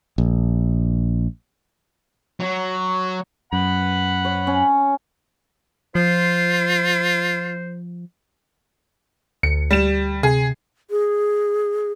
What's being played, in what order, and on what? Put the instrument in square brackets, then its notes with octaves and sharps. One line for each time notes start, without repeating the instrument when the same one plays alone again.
[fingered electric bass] A#1
[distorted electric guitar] F#3
[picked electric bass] F#2 [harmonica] F#5 B5
[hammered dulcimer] C#5
C#4
[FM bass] F3 [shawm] F4 [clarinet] C5
[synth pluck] D2 [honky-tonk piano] C#7
[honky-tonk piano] G3 E7
[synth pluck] C3 [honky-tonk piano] G#4
[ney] G#4